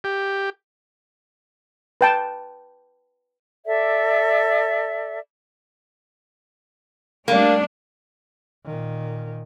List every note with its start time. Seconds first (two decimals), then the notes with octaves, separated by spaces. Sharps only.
0.04 G4
2.01 B4 G5 A5
3.65 A4 D5 E5
7.28 G3 A3 A#3 D4
8.65 A#2 D#3